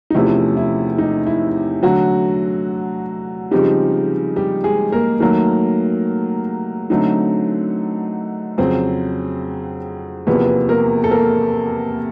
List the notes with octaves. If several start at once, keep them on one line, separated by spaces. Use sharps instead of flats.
D#4
E2 C3 F3 A3 C#4 E4
E4
D#4
E4
D3 F#3 A3 F#4
C#3 F3 G3 G#3 C4 D#4 G4
G3 G4
G#3 G#4
A#3 A#4
D#3 F#3 A3 A#3 A#4
D3 F#3 A3 C4 D#4
F2 C#3 F#3 C4 C5
E2 C3 F3 A#3 B3 B4
A#3 A#4
A4
A#3 A#4